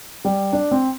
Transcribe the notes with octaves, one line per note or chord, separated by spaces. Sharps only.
G3
D4
C4